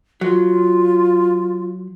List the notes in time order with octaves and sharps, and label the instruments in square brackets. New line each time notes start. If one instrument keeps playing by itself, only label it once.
[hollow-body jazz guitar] F#3 [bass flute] F4